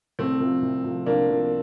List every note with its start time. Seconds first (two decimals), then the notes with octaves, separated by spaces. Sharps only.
0.19 C2 A3 C4
0.40 C3 F3 A3
0.62 C2
0.84 C3 F3 A3
1.06 C2 A#3 D4
1.28 C3 F3 A3